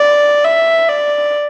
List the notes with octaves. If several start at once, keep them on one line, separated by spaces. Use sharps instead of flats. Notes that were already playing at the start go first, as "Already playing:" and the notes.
Already playing: D5
E5
D5